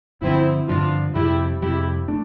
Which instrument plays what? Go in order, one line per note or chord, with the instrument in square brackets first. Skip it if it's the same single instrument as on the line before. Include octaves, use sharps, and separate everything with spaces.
[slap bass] G2 D3 F3 [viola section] C4 E4
[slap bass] G2 D3 F3 [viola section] D4 F4
[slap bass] F2 C3 G3 [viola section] E4 G4
[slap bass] F2 C3 G3 [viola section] E4 G4
[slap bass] A3 D4